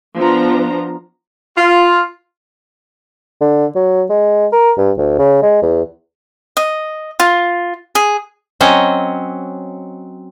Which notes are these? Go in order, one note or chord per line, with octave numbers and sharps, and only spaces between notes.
F3 B3 D4 F4 A#5
F4
D3
F#3
G#3
A#4
G2
D2
C#3
G#3
E2
D#5
F4
G#4
F#3 C4 C#4 D#5